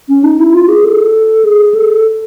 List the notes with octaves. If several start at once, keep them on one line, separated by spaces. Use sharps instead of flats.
C#4
D#4
E4
F4
G#4
A4
G#4
A4